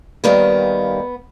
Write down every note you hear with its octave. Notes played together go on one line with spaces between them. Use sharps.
D#2 D#3 G3 A#3 B3